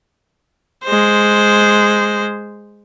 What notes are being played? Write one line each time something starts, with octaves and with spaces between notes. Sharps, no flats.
G#3 C5